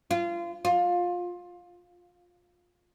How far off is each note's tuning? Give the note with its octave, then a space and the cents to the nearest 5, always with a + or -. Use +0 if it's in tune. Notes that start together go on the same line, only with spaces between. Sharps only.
F4 -25
F4 +20